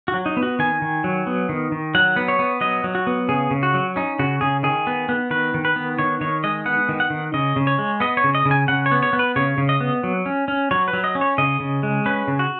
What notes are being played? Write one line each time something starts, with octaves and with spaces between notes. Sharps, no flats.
F#4
F#3
D#4
B3
F#4
D#3 G#5
D#3
F#3
B3
D#3
D#3
F#3 F#5
B3
C#5
B3
F#3 D#5
F#3
F#4
B3
C#3 G#4
C#3
F#4
F#3
C#4 D#4
C#3 F#4
C#3 G#4
D#3 G#4
B3
B3
D#3 B4
D#3
B4
B3
D#3 C#5
D#3 C#5
G#3 D#5
B3 F#5
D#3
F#5
D#3
C#3 D#5
C#3
C#5
G#3
B3 D#5
C#5
C#3
D#5
C#3
G#5
C#3 F#5
C#5
B3
C#5
B3
B4
C#3 C#5
C#3
D#5
B3
F#3
C#4
C#4
F#3 C#5
B4
F#3
D#5
C#4
C#5
C#3 D#5
C#3
G#3
C#4 B4
C#3
F#4